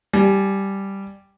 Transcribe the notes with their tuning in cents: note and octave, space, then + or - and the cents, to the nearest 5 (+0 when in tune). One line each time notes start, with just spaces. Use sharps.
G3 +0 G#5 +25